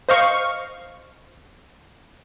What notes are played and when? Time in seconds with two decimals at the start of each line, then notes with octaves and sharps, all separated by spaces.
0.09 C5 D#5 F5 C#6